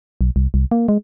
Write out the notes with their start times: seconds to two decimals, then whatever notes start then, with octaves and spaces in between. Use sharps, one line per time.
0.21 B1
0.36 C2
0.54 C2
0.71 A#3
0.89 G#3